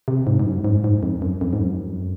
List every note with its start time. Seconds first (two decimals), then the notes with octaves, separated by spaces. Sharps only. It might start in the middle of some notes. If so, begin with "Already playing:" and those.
0.08 C3
0.27 G#2
0.40 G#2
0.45 F#2
0.65 G#2
0.84 G#2
1.03 F2
1.22 F#2
1.41 F2
1.53 G#2
1.60 F#2